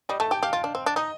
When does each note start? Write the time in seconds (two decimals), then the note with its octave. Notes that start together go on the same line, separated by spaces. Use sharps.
0.09 G3 D#5
0.20 A3 A5
0.31 G4 G5
0.42 G4 F5
0.53 F4
0.64 D4
0.75 C4
0.86 D4
0.96 D#4 D#5